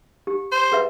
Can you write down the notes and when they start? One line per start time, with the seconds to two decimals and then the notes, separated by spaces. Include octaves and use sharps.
0.27 G4
0.52 C5
0.72 G#4 B4 E5